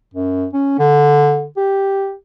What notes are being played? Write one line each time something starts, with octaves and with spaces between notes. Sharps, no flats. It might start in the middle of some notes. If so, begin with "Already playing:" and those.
F#2
C#4
D3
G4